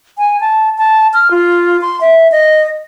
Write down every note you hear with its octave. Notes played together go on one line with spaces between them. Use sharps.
G#5
A5
A5
F6
F4
C6
E5
D#5